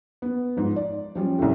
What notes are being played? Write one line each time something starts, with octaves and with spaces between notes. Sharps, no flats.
B3
G#2 F3
D5
F3 G3 C#4
C2 A2